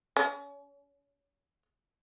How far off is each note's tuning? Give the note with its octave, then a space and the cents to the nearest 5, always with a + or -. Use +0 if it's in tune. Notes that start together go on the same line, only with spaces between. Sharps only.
C#4 +35